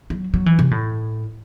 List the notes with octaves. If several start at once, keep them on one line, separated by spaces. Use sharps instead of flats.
F#3
F#3
E3
C3
A2